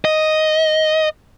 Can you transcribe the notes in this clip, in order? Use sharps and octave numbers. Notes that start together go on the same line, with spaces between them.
D#5